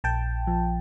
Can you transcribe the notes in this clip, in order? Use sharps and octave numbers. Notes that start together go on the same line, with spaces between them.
A#1 G5 A5
F3